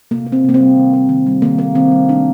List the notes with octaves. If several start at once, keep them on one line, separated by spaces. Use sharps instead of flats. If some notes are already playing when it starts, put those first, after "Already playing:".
C3 A#3
A#3
C4
C3 A#3
C4
G3
D#3
A#3
D#3
G3
D#3 A#3
A#3
D#3 C4
G3
A3 D4